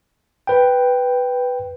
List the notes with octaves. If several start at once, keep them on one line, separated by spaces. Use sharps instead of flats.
B4 G5